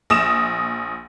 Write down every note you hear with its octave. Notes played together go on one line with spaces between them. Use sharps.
A#1 D#6 E7